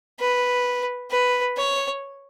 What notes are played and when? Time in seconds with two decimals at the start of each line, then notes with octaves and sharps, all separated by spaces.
0.20 B4
1.11 B4
1.57 C#5